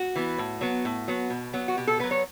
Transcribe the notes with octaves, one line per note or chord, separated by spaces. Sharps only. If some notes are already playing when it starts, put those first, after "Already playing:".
Already playing: F#4
E3 B3
A2
F#3 B3
A2
F#3 B3
B2
F#3 B3
F#4
B2 G4
A4
F#3 B3 B4
C#5